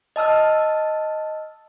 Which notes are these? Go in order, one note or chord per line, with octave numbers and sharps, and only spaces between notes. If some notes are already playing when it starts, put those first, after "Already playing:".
D#5 A5 E6 F6